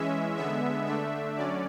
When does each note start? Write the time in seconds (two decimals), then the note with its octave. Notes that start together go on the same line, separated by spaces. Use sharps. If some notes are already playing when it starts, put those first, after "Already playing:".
Already playing: E3 G#3 C#4 E5
0.37 D3 G#3 B3 E5
0.87 D3 A3 D4 E5
1.36 D3 F#3 C#4 D5